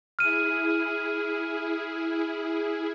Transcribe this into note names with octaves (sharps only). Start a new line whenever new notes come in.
E4 G#4 F6 D#7